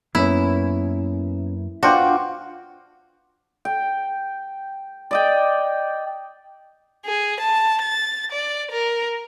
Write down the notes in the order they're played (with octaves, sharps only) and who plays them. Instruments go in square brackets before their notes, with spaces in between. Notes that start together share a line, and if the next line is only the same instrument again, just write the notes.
[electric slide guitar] F#2 A#3 B4 [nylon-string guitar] B3 C#4 [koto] E4
[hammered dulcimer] D4 F4 G5 [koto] F#4 [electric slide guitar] B4 C5 [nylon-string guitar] F#5
[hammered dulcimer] G5
D5 D#5 G5
[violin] G#4
A5
A6
D5
A#4